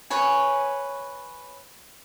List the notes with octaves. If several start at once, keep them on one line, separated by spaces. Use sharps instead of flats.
B4 C#5 G#5